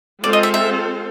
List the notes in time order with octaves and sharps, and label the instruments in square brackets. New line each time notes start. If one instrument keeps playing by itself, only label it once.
[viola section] G#3 C4 F4 A4 C5 [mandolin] D5
[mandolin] D#5
E5
E5